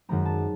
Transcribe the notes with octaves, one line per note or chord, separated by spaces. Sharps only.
F#2 D#3 G#3 C4 A#5
A5